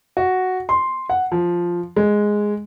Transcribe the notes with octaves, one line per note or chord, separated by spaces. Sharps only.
F#4
C6
F#5
F3
G#3